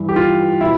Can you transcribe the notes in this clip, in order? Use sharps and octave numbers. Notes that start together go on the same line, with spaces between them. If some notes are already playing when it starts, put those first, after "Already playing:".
Already playing: G2 E3
G4
F4
B2 E4